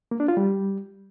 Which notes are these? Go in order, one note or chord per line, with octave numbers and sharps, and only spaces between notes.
A#3
D4
F4
G3